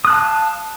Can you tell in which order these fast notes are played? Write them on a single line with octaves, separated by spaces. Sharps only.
D#6 F#6 A5 F5